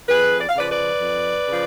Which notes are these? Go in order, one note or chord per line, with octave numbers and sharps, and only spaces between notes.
F2 G#4 B4
D5
F5
C#3 F3 B4 D5
B4 D5
F2
C#3 F3